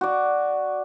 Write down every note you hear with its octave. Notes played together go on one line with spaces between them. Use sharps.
F#4 D5